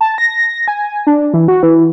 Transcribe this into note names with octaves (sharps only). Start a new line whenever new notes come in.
A5
A#6
G#5
D4
E3
F#4
E3